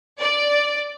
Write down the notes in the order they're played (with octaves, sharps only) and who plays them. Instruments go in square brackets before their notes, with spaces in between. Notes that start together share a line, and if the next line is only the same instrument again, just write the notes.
[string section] D5